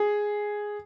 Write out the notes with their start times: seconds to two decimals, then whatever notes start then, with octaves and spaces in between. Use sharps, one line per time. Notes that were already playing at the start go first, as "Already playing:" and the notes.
Already playing: G#4